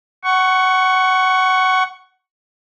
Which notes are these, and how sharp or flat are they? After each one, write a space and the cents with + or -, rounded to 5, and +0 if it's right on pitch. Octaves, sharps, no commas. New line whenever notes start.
F#5 +20 C#6 +0